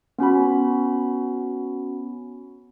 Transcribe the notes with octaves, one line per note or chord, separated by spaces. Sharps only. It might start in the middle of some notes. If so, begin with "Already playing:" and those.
B3 C#4 F#4 B5